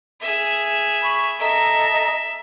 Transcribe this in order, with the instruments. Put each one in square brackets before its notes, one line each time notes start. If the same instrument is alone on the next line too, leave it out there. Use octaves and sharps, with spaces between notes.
[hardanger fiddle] G#4 E5
[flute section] B5 C#6
[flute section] A4 D#5 A#5 [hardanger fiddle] E5